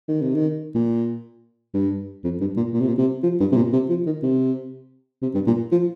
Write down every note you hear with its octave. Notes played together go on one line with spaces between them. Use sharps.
D#3
C3
D#3
A#2
G2
F2
G2
A#2
A#2
C3
A#2
C3
F3
G2
C3
A#2
C3
F3
D#3
C3
C3
G2
A#2
F3